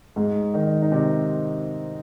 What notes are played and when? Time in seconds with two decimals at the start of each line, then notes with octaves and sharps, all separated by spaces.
0.16 G#2 G#3
0.54 D#3 D#4
0.82 D#4
0.92 C3 C4